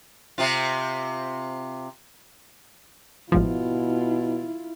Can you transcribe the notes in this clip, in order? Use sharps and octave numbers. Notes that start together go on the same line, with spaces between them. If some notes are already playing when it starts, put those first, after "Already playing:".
C3 C4 F4
A1 G#2 B2 F3 E4 F4